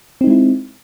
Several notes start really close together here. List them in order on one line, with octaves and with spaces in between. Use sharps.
C4 D#4 G#3 E4